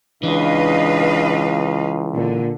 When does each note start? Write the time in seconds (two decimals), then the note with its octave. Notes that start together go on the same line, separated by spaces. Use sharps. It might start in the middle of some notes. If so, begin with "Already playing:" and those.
0.23 C#2 E3 D4 B4 D#5 F5
2.15 A#2 D3